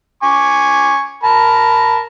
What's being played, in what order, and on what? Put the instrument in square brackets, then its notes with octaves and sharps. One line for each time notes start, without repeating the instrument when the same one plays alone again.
[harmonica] G#5 C#6 D6
A#4 A5 B5